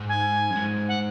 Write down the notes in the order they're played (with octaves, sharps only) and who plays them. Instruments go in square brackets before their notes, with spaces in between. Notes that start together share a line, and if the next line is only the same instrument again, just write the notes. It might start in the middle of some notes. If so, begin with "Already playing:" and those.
Already playing: [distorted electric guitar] G#2
[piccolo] G#5
[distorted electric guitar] F#2
G#2
[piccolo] F#5